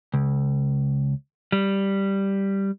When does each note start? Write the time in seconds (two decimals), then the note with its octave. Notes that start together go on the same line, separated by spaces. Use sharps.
0.14 C#2
1.52 G3